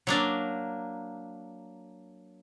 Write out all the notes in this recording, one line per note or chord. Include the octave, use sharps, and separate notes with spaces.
F#3 A#3 D4